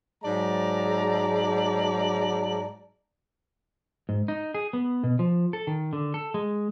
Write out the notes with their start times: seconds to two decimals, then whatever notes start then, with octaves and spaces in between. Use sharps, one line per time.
0.24 G#2 F#3 G#3 D5 A5 A#5
4.09 G#2
4.28 D#4
4.54 G#4
4.73 B3
5.04 B2
5.19 F3
5.53 A4
5.67 D#3
5.93 D3
6.14 A4
6.34 G#3